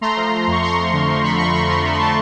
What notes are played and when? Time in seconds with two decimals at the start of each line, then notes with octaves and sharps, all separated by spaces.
0.01 A3 A#5 C6
0.17 F3
0.32 A3
0.47 F2 C#6
0.62 F2 A#5 C6
0.78 F2
0.93 D3
1.08 F3
1.24 D3 B5 C#6
1.38 F2 B5 C#6
1.54 F3 B5 C#6
1.69 F3 A#5 C6
1.84 A3 B5
1.93 C6
2.00 A3 A5 B5